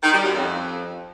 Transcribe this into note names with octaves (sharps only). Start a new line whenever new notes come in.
D#3
G3
F#2
F2